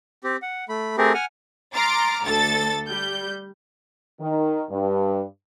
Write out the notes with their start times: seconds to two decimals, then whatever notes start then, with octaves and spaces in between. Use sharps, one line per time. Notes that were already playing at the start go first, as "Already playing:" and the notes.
0.24 C4 G4
0.42 F#5
0.69 A3 B5
0.98 A3 C4 G4 G#4 A#4
1.14 F#5 G#5 F6
1.74 A#5 C6 D6 F6 A6
2.24 D2 A4 A6
2.88 G3 G6
4.20 D#3
4.70 G2